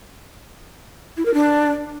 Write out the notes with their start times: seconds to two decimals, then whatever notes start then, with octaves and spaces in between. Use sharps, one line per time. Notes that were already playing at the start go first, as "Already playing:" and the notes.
1.17 E4
1.26 A#4
1.34 D4